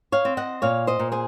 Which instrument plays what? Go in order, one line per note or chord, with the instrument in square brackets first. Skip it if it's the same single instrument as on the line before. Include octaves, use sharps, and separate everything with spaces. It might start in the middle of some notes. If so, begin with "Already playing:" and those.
[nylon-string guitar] C#5 F5
C4
D#5 F#5
A#2 C#5 F5
C5 D#5
A#2
G#4 C5